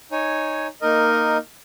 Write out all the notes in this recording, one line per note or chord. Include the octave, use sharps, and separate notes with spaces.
D#4 C#5 G#5
A#3 D#4 A#4 D#5